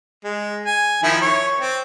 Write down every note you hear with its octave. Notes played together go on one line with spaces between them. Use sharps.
G#3
G#5
D#3 F3 E4
C#5
C4